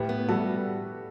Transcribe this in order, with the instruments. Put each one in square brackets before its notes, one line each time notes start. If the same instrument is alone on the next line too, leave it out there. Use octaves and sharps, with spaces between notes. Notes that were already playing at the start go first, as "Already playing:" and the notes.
Already playing: [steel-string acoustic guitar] A2 [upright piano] G4 B4
[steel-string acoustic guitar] B3
[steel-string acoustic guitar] G3 [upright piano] F#4 A4